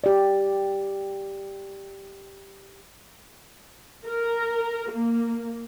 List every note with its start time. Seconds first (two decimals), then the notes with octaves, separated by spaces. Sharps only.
0.04 G4 D5
4.06 A#4
4.90 A#3